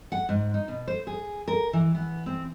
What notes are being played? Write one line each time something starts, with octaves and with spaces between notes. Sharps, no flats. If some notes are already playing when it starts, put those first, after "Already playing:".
F#5
G#2
D#4
B2
C5
G#4
A#4
E3
B3
C4